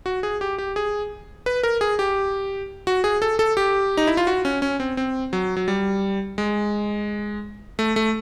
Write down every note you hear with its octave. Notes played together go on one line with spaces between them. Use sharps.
F#4
G#4
G4
G4
G#4
B4
A#4
G#4
G4
F#4
G#4
A4
A4
G4
D#4
E4
F4
F#4
C#4
C#4
C4
C4
F#3
F#3
G3
G#3
A3
A3